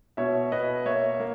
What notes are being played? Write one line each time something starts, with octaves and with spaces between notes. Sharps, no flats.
B2 C#5 E5
B2 B4 D#5
A#3 C#5 E5
A#3